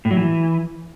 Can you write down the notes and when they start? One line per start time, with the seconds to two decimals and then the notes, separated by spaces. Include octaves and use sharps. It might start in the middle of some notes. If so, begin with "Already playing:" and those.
0.05 A2
0.11 F#3
0.17 E3